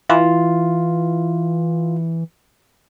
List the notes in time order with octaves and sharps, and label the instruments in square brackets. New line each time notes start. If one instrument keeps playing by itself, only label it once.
[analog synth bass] E3 [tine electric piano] F4